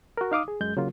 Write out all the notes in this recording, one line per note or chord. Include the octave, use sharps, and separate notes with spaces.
F#4 A#4
D#4 F5 D6 D#6
G#4
F#2 G#3 G6
C#3 F#3 A#3 F4